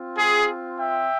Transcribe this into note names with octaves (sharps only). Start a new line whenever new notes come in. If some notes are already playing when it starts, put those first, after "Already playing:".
Already playing: C4 F4
G#4
E5 G5